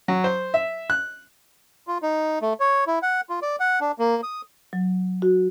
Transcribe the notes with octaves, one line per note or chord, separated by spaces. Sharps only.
F#3
C5
E5
F#6
F4
D#4
A3
C#5
E4
F#5
F4
D5
F#5
D4
A#3
D#6
F#3
F#4